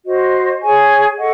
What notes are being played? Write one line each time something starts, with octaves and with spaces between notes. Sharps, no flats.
F#4 C5 D#5
G#4 C#5 G#5 C#6
A4 D#5 F#5 C#6